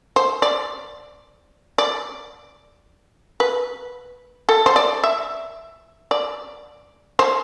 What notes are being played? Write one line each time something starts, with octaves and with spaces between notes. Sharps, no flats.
C5
D5
D5
B4
A4
C5
D5
E5
D5
C5